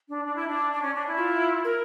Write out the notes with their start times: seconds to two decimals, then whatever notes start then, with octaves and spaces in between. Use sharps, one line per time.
0.09 D4
0.24 D4
0.35 E4
0.47 D4
0.71 D4
0.83 C#4
0.94 D4
1.06 E4
1.17 F4
1.65 A#4